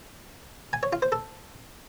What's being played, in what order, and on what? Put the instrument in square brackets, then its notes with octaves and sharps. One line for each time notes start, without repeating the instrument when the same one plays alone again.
[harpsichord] G#5
C#5
F4
C5
A4